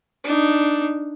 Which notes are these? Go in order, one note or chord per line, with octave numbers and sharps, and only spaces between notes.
D4 D#4